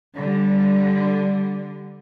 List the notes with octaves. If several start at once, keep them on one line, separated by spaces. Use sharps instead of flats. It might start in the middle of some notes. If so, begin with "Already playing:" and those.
D3 G3